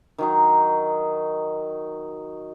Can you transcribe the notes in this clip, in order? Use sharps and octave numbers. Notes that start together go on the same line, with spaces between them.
D#3 F#3 D#4